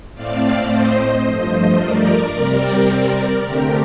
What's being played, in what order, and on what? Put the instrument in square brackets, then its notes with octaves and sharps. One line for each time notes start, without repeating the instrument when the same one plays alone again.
[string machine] A2 A3 C4 D5 F5
C5 D#5
G2 F3 A3
A#4 D5
C3 G3 C4
D3 A3 C4 G4 A#4